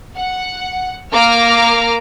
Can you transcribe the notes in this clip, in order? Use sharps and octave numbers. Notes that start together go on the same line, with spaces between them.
F#5
A#3 A#5 D6 F6